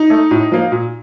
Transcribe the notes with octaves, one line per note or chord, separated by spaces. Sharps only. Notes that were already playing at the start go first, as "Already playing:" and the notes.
Already playing: D#4
A3
A2
F3 A#3
A#2